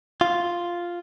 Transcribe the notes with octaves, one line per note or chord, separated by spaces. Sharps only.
F4